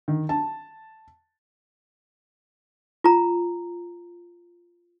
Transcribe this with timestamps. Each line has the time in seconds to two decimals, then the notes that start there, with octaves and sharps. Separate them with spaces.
0.08 D#3
0.29 A5
3.04 F4 A#5